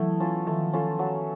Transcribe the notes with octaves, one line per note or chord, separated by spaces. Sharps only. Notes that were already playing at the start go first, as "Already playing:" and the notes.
Already playing: E3 F#3 A3 B3 E4
C#4 F4 A4
D#3 F3 A3
C#4 F4 A4
F#3